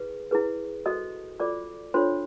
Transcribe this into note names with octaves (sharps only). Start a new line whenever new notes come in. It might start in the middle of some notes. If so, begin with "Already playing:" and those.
Already playing: E4 G#4 B4
E4 G#4 B4
F#4 A4 C5 D#5 D#6
F4 A4 C5 D5 D6
D4 F4 A4 C5 C#5 C6